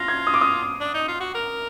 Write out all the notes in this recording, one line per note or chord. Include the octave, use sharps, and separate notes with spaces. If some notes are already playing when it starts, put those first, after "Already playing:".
Already playing: F4 A#6
G#6
D#6
D6
D#6
D4
D#4
F4
F#4
A#4